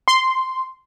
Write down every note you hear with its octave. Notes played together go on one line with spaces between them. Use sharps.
C6